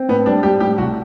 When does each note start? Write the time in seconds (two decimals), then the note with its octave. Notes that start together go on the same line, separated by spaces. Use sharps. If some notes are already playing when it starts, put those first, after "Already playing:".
Already playing: C4
0.09 A2 B3
0.26 G3 D4
0.43 G3 G4
0.60 A2 G4
0.78 C2 F#4